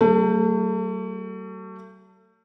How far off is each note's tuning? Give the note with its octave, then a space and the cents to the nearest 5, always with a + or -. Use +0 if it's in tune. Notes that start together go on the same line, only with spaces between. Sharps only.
F#3 +45 A3 +35 G#4 +0